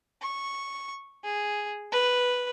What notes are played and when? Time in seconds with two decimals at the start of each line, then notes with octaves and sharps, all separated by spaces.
0.22 C#6
1.24 G#4
1.92 B4